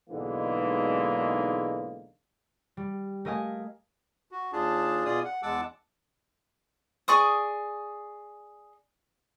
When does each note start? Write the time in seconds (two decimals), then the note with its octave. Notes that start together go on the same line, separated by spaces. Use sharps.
0.10 B1 G#2 D3 E3 G#3 A#3
2.77 G3
3.25 A3 A#4 D#5 F5 G#5
4.31 F#4
4.53 D#2 D4 F4 G#4 A5
5.05 B2 F4 G#4 D5 D#6
5.25 F#5
5.43 E2 G#3 F#5 A5 D6 E6
7.08 G#4 D5 C#6 D#6